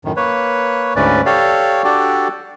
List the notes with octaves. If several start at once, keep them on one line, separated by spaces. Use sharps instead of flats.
F#2 A2 D#3
A#3 B4 C#5
D2 G#2 A3 C#4 B4 D5
G4 A4 C#5 D5 F5
D4 F#4 G4 A4 D5